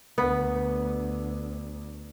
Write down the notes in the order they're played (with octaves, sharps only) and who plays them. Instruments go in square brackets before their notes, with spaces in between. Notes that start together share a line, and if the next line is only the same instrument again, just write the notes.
[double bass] D2 [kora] B3